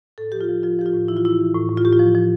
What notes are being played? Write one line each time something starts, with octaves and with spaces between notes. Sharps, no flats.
A2 A4
F3 G4
F4
F3
F3 F4
F3 G4
F4
A2
E3 E4
F4
A2 E4
E3
A2
A2
F4
A2 G4
F4
F3
F3